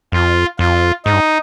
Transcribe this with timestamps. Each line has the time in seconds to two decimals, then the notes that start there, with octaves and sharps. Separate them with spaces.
0.12 F2 F4
0.59 F2 F4
1.05 G#2 D#4
1.13 G2